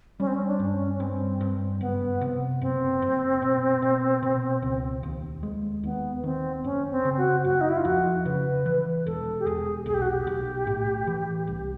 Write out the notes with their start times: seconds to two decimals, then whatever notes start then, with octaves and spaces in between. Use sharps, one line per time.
0.20 G3 C#4
0.27 C4
0.34 C#4
0.47 D4
0.59 G2
0.73 C#4
0.94 C#4
1.00 G2 C4
1.41 G2
1.80 F#1 B3
2.21 C3
2.61 F#1 C4
3.02 F#1
3.42 B2
3.82 B2
4.23 B2
4.62 C#2
5.03 D#2
5.43 G#3
5.84 D#2 B3
6.23 D#3 C4
6.64 F#1 C#4
6.91 C4
7.05 C#3
7.18 F#4
7.44 F#1 F#4
7.61 D#4
7.69 E4
7.77 F4
7.85 F2 F#4
8.25 C#3 B4
8.66 E3
9.06 E1 A4
9.40 G4
9.46 E1 G#4
9.86 B1 G#4
9.94 G4
10.02 F#4
10.09 G4
10.27 B1
10.67 A2
11.07 E3
11.47 C2